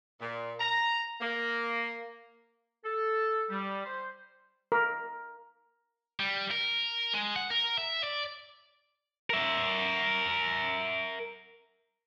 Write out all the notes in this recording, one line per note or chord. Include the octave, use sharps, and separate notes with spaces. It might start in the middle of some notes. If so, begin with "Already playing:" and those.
A#2
A#5
A#3
A4
G3
C5
A#4
G3
A#4
G#3
F#5
A#4
E5
D5
A#4 E5